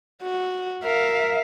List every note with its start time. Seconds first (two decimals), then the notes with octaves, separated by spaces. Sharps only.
0.23 F#4
0.84 A#4 E5 F5